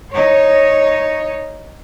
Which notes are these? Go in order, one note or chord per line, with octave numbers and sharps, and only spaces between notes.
D#4 C#5